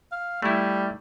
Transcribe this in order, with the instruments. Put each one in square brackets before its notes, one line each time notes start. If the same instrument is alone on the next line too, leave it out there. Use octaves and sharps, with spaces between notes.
[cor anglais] F5
[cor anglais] G3 [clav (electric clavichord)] A3 E4